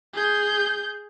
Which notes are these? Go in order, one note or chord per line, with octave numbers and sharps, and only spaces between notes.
G#4 G6